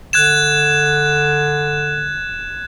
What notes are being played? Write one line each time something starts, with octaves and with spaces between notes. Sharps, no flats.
D3 F#6 G#6 E7